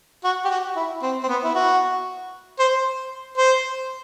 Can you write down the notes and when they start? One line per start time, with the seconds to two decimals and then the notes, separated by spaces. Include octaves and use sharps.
0.24 F#4
0.45 G4
0.50 F#4
0.76 E4
1.02 C4
1.23 C4
1.28 B3
1.44 E4
1.55 F#4
2.59 C5
3.38 C5